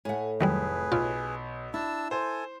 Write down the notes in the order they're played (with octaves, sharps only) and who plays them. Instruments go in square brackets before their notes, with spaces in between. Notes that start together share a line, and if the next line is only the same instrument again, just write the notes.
[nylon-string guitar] A2 A3 [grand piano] F#5 G#5
[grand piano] F1 [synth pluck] D#3 F#3 G3 [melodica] G#4 B4
[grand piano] B1 [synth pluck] F4
[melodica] D4 A5 E6 [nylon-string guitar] E4
[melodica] A4 G#5 [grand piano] C5